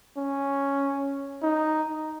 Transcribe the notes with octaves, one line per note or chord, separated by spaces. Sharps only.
C#4
D#4